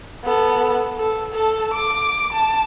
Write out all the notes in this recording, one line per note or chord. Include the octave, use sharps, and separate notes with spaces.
B3 A4
A4
A4 A5
D6
A5